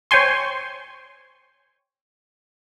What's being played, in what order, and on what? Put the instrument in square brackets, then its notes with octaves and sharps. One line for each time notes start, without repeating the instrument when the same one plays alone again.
[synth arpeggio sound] C5 C#5 G5 G#5 C6